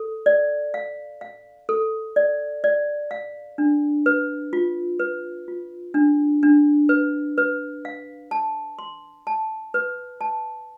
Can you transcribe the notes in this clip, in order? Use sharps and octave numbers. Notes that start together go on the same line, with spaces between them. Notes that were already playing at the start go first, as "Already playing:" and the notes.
Already playing: A4
D5
F5
F5
A4
D5
D5
F5
D4
B4
F4
B4
F4
D4
D4
B4
B4
F5
A5
C6
A5
B4
A5